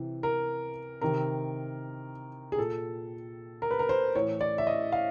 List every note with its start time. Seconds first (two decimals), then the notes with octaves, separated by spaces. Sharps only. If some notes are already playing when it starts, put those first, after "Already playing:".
Already playing: C3 E3
0.23 A#4
1.01 C3 D#3 A#4
2.52 G#4
2.58 A#2 A4
3.62 A#4
3.71 B4
3.79 A#4
3.89 C5
4.15 A2 E3 C#5
4.41 D5
4.58 E5
4.67 D#5
4.92 F5